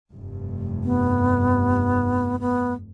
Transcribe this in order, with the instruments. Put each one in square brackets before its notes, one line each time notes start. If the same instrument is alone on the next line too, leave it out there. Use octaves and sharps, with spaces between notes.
[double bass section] F1 G2
[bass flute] B3
B3